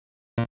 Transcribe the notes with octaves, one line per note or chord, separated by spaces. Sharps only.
A#2